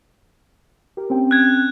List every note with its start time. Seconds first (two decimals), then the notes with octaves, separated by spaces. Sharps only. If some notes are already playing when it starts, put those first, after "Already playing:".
0.97 G4 A#4
1.10 C4 C#4 G5
1.31 F#6 G#6